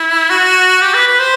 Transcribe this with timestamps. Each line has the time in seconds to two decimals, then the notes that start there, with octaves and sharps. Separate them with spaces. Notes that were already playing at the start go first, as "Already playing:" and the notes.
Already playing: E4
0.30 F#4
0.82 G4
0.94 B4
1.07 B4
1.19 C5